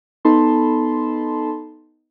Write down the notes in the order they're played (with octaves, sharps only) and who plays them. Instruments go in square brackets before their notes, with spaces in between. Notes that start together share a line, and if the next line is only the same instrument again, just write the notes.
[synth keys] B3 D#4 A4 A5 B5 C6